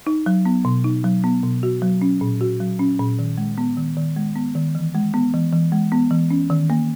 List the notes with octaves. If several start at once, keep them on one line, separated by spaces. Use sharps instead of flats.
D#4
F#3
B3
B2
D#4
F#3
B3
B2
F#4
F#3
C#4
A#2
F#4
F#3
C#4
A#2
D#3
G#3
B3
D#3
D#3
G#3
B3
D#3
E3
G#3
B3
E3
E3
G#3
B3
E3
C#4
D#3
A#3